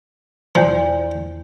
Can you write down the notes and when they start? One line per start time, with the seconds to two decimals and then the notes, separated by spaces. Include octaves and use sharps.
0.55 E2 F3 D5